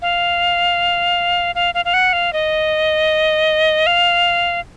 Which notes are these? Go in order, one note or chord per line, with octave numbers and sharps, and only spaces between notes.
F5
F5
F5
F5
F#5
F5
D#5
F5